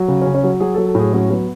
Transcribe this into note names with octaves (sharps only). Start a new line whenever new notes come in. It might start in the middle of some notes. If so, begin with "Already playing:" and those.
Already playing: F#3
C#3
C#4
C#3
C#4
F#3
F#3 G#4
F#3 A4
A4
A2 G#4
F#3 C#4
F#3 B3